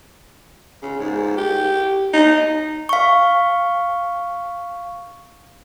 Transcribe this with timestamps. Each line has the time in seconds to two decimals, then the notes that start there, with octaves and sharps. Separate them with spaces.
0.82 C#3
1.00 G#2
1.37 G4
2.13 D#4
2.89 F5 C#6